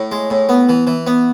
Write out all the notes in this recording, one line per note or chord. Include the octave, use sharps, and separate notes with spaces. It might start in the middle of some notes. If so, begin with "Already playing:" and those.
Already playing: A2
G#3
A2
B3
E3
E3
B3